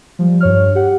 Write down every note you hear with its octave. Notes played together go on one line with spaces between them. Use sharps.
F3 G3
G2 C#5 F6
G4 F#5